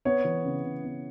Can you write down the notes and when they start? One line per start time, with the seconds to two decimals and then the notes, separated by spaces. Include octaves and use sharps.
0.05 B3 C#5
0.24 E3
0.45 C#3
0.64 C#3
0.85 B3